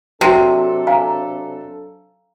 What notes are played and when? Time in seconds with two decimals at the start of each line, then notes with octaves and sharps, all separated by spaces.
0.21 C3 F#3 D4 A4 C6
0.87 F5 G#5 A#5